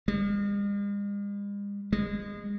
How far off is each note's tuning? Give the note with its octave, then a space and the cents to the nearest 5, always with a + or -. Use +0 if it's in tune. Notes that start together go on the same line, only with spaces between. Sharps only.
G#3 -45
G#3 -30